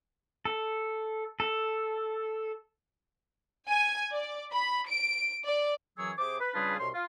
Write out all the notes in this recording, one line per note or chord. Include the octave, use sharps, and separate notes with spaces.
A4
A4
G#5
D5
B5
D7
D5
F#2 E3 F#3 G#4 C#5 E6
C3 G#4 C5 D6
B4
C#3 G3 D4 F4 G#4 B4
C2 B2 C#5 C6
F4